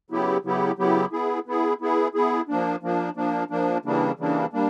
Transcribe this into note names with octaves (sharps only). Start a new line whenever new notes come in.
C#3 F#3 B3 E4 G4
C#3 F#3 B3 E4 G4
C#3 F#3 B3 E4 G4
B3 E4 G#4
B3 E4 G#4
B3 E4 G#4
B3 E4 G#4
F3 A#3 D4
F3 A#3 D4
F3 A#3 D4
F3 A#3 D4
C#3 E3 G3 A#3 D4
C#3 E3 G3 A#3 D4
G3 A#3 D4